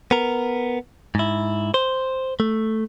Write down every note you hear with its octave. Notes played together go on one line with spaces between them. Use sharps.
B3 A#4
G#2 E4
C5
A3